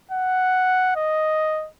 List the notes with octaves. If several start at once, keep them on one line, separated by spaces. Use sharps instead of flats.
F#5
D#5